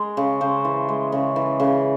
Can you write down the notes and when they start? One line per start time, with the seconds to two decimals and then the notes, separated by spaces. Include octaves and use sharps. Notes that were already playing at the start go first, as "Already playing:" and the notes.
Already playing: G#3 A#4
0.17 C#3
0.41 C#3 C5
0.65 E3
0.89 G#3
1.12 C#3
1.36 E3
1.60 C#3